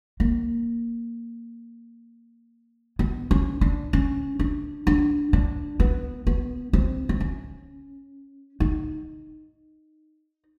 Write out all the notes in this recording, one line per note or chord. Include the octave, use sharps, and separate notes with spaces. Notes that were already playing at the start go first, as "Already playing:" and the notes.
A#3
B3
C#4
D4
C#4
D4
D4
D4
B3
B3
C4
C4
C#4
D#4